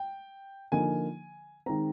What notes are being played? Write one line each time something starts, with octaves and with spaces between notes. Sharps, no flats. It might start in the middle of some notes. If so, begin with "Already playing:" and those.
Already playing: G5
D3 F3 A#3 D#4 G#5
D#3 G#3 C4 A#5